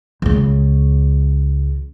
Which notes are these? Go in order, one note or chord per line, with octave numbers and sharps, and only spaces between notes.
C#2 C#3